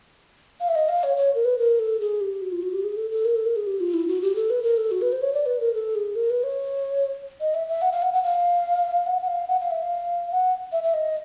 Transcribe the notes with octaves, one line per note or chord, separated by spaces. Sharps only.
F5
E5
D#5
F5
C#5
C#5
A#4
B4
A#4
A4
G#4
G4
F#4
F4
F#4
G4
G#4
A4
A4
A#4
A4
A#4
G#4
G4
F4
E4
F#4
G4
A4
B4
A#4
A4
F#4
B4
C5
C#5
D5
B4
A#4
A4
G#4
A#4
B4
C#5
D#5
E5
E5
F#5
F5
F#5
F#5
F5
F#5
F#5
F5
F#5
F5
E5
F5
F#5
E5
E5
D#5